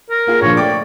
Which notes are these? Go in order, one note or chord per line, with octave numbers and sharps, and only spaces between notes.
A#4
A#3 F4 G#4
A#2 D3 F3 C#5
A3 D5 G5 D6